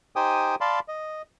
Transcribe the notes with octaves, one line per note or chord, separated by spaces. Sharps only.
D#4 G4 C5 G5 G#5 D#6
D5 F5 A5 B5 C6
D#5